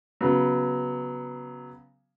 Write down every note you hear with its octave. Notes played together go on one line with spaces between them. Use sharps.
C#3 F#3 B3